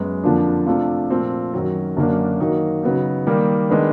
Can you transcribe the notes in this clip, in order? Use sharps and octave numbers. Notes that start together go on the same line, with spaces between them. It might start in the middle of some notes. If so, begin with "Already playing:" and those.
Already playing: F#2 G#3 B3
F2 D3 F3 A#3 D4
C3 F3 A3 D4 F4
A#2 F3 A3 C4
F#2 D#3 F#3
F#2 D3 F#3 A#3 D4
D#3 F#3 A#3 D#4
C#3 F#3 B3 D#4
D#3 G3 A#3
D#3 G#3 B3 D4